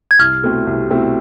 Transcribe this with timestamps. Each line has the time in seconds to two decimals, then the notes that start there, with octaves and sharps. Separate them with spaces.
0.11 G#6
0.19 C2 F6
0.43 B2 A3 C4 E4
0.67 C2
0.90 B2 A3 C4 E4